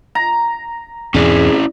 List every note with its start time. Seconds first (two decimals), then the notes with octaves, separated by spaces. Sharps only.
0.15 A#5
1.14 E2 G#2 B2 C4 C#4 E4 G#4 D5